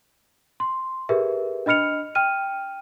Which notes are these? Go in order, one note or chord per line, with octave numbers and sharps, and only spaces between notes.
C6
G4 G#4 A#4 B4 E5
D4 D#5 B5 F6 C#7 F7
G5 F6 D#7